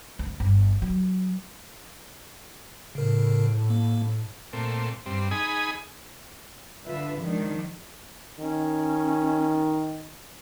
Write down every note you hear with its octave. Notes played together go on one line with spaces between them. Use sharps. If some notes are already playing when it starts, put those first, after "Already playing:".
D2
G1
F#3
A2 C#3 A#4
A#3
A#2 A3 C4
G2 C4
D#4 G#4 G#5 B5 D#6
D3 F4 B4 E5
D#3 F3 G#3 D4
D#3 C#4